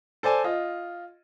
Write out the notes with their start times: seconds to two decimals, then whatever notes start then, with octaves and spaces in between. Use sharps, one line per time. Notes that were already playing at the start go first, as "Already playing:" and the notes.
0.23 A4 C5 D5 G#5
0.44 F4 D#5